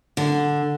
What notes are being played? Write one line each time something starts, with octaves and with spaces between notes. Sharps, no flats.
D3